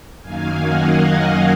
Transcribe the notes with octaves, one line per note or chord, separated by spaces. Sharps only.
F#2 D#3 F#3 A#3 F5 G#5
D#5 F#5
D#5 F#5